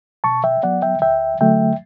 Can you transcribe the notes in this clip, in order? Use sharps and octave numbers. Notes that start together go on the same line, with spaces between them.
B2 A5 C#6
E5 G5
F#3 B3 D5 F#5
E5 G5
D2 E5 G5
D3 F#3 A3 E5 G5